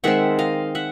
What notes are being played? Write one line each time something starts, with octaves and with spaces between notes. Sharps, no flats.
D#3 G#3 C4 E5 F#5
D#5 F5
E5 F#5